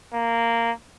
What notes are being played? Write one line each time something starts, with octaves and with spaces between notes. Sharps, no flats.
A#3